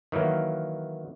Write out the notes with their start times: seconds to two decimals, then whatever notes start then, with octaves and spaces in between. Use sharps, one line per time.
0.12 D#3 E3 F#3 A#3